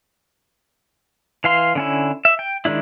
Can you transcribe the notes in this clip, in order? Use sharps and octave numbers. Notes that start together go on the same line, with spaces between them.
E3 F5 C6
D3 C#4 E4
E5
G5
D#3 G#3 D4 E4